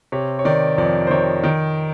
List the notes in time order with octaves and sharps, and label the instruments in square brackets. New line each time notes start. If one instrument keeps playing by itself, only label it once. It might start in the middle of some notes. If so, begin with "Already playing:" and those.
[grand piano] C3 C#5
C#5
D#3 D5
F2 D5
C5
D#3 C#5
D#3